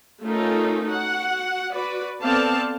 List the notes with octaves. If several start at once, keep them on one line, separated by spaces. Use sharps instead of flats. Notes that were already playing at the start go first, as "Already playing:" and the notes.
A3 C#4 D#4 F4 A4 A#4
F#4 F#5
F#4 B4 D5
B3 C4 A4 D5 F5 A5